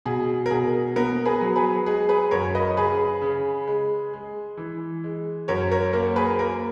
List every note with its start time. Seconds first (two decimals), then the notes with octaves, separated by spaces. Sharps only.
0.06 B2 G#4
0.46 A#4
0.50 B2 G#4
0.96 B3 A#4
1.26 G#4 B4
1.41 F#3
1.56 G#4 B4
1.86 G#3 G#4
2.09 G#4 B4
2.31 F#2 A#4 C#5
2.55 B4 D#5
2.77 C#3 G#4 B4
3.22 C#3
3.67 G#3
4.13 G#3
4.57 E3
5.04 G#3
5.48 F#2 A#4 C#5
5.72 A#4 C#5
5.93 A#3 A#4
6.16 G#4 B4
6.39 A#3 A#4